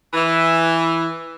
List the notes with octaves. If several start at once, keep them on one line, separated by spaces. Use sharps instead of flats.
E3